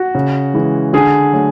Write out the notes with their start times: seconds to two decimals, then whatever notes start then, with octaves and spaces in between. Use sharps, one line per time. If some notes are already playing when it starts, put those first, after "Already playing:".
Already playing: F#4
0.15 C#3
0.54 E3 G#3
0.93 D3 G#4
1.33 F#3 A3